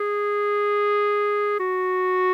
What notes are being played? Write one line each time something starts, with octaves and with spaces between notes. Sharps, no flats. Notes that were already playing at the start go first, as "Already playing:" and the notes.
Already playing: G#4
F#4